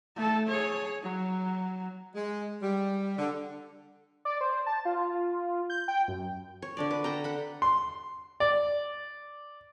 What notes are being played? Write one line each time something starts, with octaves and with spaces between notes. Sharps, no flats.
A3 A4
G#4 C#5
F#3
G#3
G3
D3
D5
C5
A5
F4
G6
G5
F#2
C#5
D3 D4 D5
B4
A4 G5 A#5
F#5 B5
C6
D5